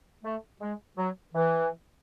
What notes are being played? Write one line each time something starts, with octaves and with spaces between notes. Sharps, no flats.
A3
G#3
F#3
E3